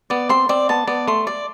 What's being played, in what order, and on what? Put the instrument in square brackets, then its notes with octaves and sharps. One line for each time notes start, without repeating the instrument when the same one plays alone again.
[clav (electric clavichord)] B3 [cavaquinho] D5
[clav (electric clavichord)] C4 [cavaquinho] C6
[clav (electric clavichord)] C4 [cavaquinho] D5
[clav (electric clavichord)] B3 [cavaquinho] A5
[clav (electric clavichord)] B3 [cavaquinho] D5
[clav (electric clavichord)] A3 [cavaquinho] C6
[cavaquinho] D5